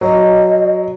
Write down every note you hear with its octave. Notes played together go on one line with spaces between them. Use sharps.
F#3 D#5